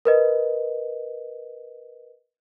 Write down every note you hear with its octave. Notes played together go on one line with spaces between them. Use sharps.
A#4 B4 D#5